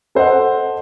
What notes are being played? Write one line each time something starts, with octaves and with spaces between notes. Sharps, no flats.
A4 C5 D#5 F#5